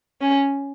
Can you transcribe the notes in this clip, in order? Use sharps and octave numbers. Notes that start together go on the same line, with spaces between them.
C#4